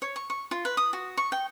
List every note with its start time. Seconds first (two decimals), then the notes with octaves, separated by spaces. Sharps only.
0.02 C#5
0.16 C#6
0.30 C#6
0.51 F4
0.65 B4
0.77 D#6
0.93 F#4
1.17 C#6
1.32 G5